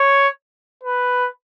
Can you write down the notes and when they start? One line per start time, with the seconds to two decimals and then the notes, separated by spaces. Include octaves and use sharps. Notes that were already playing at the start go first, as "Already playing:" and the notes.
Already playing: C#5
0.83 B4